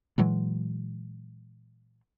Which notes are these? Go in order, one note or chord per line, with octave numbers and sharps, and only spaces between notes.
A#2 E3 F#3 G#3